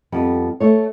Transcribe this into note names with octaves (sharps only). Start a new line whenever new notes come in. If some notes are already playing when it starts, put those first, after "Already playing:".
F2 G3 B3
A3 C#5